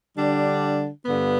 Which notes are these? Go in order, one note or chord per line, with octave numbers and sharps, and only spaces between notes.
D3 G3 D4
G2 D3 B3